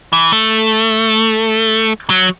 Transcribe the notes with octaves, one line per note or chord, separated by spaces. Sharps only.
E3
A3
F#3